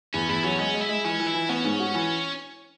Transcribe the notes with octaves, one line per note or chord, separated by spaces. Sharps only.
E2 C#4
E2 E4
F#3 C#4
G#3 C#4
G#3
E4
G#3
E3 C#4
E3
E4
E3
B3 C#4
G#2
F#4
E3